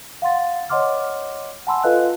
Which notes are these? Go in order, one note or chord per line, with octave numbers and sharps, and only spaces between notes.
F5 F#5 C6 A6
C#5 D#5 F#5 C6 D6 F6
F#5 G#5 A5 B5 C6 E6
F4 A4 B4 D#5 F5 F#6